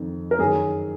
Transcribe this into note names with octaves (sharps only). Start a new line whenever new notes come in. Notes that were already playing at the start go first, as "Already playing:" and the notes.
Already playing: F2 D#3
A#4
F#2 D#3 G#4